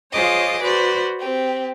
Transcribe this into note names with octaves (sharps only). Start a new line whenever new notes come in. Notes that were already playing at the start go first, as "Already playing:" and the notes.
F4 G#4 C5 C#5 D#5 D6
F#4 B4 C5 D5
C4 G4